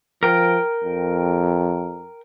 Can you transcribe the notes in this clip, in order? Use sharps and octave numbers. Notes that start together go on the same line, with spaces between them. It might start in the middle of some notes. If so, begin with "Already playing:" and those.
F3 A#4 G5
F2